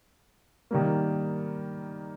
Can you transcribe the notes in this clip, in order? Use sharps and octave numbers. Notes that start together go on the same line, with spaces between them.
D#3 G3 A#3